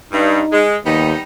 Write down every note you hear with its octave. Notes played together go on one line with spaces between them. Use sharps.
G2 D#4
G#3
D#2 G3 B3 D#4